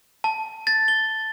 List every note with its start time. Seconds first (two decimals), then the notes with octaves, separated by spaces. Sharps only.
0.24 A5
0.67 A6
0.88 G7